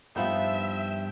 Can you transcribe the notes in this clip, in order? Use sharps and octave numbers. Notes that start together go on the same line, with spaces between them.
G2 F3 B3 D#4 E5 G5